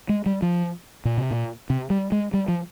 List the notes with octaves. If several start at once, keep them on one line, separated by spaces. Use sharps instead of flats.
G#3
G3
F3
A#2
C3
A#2
C3
G3
G#3
G3
F3